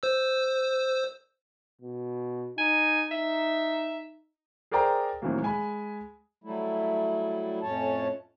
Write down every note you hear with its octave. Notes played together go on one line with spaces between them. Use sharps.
C5 E6
B2
D#4 G#5
D#4 E5
G#4 A#4 C5 D5 G5 A#5
A2 C3 D#3 E3 F#3 A#3
G#3 G#5 B5
F#3 G3 A3 E4
F2 A2 C#4 C#5 A5